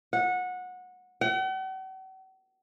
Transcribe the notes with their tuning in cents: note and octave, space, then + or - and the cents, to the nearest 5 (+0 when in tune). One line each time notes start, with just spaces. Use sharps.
F#5 -20
F#5 +45